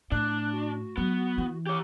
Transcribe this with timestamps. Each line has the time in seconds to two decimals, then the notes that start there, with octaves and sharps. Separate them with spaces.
0.12 A2 D4 F#6
0.52 F#4
0.97 F#3 B3
1.38 E3
1.67 G4 C#5 D6